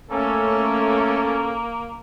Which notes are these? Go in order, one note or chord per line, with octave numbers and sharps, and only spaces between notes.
A3 A#3 C#4 A4